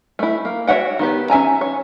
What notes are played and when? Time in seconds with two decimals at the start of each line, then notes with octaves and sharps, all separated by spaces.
0.19 A3 E4
0.45 A#3
0.67 F#4 C#5 E5 F#5 G5
0.99 D#3 B3 G4
1.30 C#4 E5 G#5 A#5
1.61 C#5